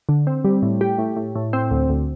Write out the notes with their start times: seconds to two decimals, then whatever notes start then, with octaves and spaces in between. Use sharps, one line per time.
0.09 D3
0.27 C4
0.45 G3
0.63 A2
0.81 G4
0.98 A2
1.17 A2
1.36 A2
1.53 C4
1.71 D2
1.89 D2